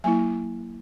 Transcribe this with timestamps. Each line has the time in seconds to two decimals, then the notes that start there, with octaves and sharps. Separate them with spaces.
0.04 F#3 A#3 E4 G#5